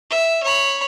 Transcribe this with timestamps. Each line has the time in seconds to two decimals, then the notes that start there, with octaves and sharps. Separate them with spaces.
0.10 E5
0.43 C#5 B5